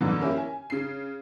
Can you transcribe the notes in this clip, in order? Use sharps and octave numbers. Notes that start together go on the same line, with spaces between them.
F#2 B2 D3 E3
A#3 C#4 E4 G4
G#5
C#3 C7